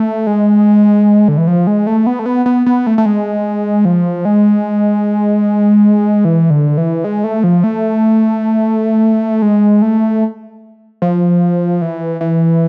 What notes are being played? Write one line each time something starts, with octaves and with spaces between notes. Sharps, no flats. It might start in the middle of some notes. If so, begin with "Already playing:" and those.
Already playing: A3
G#3
D3
E3
F3
G#3
A3
B3
A3
B3
B3
B3
A3
A3
G#3
F3
G#3
E3
D3
E3
G#3
A3
F3
A3
G#3
A3
F3
E3
E3